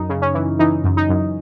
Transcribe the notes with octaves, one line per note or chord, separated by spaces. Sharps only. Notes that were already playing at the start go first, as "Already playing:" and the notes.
Already playing: F#2 D#4
C#3
C#4
E3
E3 D#4
F#2
D#4
F#2